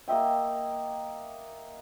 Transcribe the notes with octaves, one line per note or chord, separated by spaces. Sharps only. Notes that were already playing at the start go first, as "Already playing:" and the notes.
A#3 D#5 E5 G5